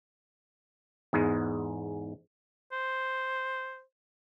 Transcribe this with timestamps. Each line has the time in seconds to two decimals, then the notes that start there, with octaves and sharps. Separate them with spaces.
1.13 E2 G#2 G#3 B3
2.72 C5